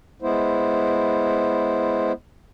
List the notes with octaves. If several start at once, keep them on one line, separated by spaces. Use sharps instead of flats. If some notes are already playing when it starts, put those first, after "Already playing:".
G#3 B3 E4 C5